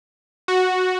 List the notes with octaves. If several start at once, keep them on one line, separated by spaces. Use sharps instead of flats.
F#4